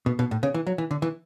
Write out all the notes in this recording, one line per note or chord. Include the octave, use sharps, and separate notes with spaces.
B2
B2
A2
C#3
E3
F#3
E3
D3
E3